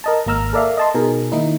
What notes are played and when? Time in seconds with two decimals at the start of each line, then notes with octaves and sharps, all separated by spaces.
0.04 A#4 D#5 A5
0.26 G#1 A#3 A#5 E6 F6
0.53 A4 A#4 D5 E5 F5
0.78 D#5 A5 C6
0.95 B2 D#4 G#4 A#4
1.32 D#3 A#3 D#4 E4